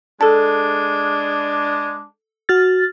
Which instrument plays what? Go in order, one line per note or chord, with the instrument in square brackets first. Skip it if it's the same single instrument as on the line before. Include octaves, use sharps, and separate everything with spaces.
[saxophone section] G#3 D4 [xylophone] A4 A5
[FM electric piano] F#4 F6 A6